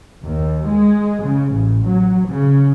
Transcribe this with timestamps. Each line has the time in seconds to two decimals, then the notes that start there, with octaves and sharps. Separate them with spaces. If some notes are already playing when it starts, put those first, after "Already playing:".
0.24 D#2
0.67 G#3
1.23 C#3
1.52 A1
1.83 F#3
2.26 C#3